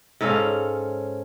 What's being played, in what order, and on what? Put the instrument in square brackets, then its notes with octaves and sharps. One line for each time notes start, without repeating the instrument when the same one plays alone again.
[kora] G#2 C#4 A4 F5